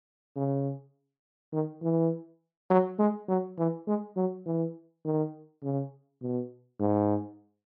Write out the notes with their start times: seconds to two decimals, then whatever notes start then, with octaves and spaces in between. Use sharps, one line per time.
0.36 C#3
1.53 D#3
1.83 E3
2.70 F#3
2.99 G#3
3.28 F#3
3.58 E3
3.87 G#3
4.17 F#3
4.46 E3
5.05 D#3
5.63 C#3
6.22 B2
6.80 G#2